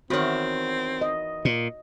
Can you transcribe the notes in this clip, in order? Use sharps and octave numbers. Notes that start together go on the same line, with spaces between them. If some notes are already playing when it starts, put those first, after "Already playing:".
E2 D#3 C4 F#4 C#5
D#5
A#2